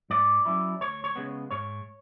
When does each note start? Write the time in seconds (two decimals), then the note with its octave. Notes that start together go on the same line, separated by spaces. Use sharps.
0.10 G#2 D5
0.45 F#3 C#4 E4
0.80 D2 C#5
1.04 C#5
1.16 C#3 G#3 B3
1.51 G#2 C#5